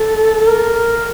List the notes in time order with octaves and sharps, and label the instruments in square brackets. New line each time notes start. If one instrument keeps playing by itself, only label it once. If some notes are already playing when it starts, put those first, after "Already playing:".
Already playing: [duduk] A4
A4
A#4